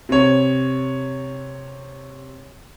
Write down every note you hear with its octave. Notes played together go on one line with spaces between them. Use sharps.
C3 C#5